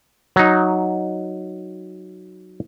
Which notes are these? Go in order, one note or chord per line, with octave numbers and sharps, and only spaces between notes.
F#3 D#4